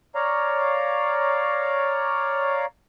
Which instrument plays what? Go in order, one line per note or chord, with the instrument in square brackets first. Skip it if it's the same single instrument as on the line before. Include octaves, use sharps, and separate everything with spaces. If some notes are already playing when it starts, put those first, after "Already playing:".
[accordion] C#5 D5 F5 A#5